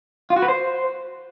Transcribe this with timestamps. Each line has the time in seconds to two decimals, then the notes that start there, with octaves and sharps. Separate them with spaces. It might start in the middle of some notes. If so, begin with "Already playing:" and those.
0.30 F4
0.36 F#4
0.42 B4
0.48 C5